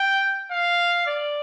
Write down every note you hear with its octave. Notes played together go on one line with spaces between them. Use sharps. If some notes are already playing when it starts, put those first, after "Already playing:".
Already playing: G5
F5
D5